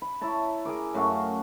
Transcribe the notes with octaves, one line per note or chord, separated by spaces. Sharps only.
B5
E4 C#5 A5 A#5
G#4 A#4 D6
F#2 A3 F#4 F5